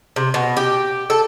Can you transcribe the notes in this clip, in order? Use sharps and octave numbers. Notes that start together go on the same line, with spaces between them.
C3
B2
G4
A4